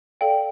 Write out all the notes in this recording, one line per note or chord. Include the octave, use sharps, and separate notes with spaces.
A4 D5 F5 G5